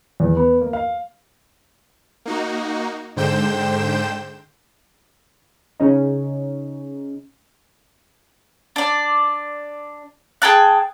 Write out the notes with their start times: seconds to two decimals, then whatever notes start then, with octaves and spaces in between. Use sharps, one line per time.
0.20 E2
0.37 B3
0.61 A#3
0.73 F5
2.26 A#3 D#4 F#4
3.16 G#2 D3 C5 G5 G6 E7
5.80 C#3 C#4 D#4
8.76 D4 D5
10.42 G#4 G5 A5 F#6